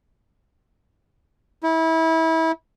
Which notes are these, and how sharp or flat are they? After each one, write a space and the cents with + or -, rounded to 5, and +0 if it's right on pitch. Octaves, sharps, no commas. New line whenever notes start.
E4 -25